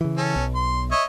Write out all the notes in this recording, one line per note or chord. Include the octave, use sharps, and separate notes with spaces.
C#3 E3
C#4 A4
B1
C6
C#5 D#5 E5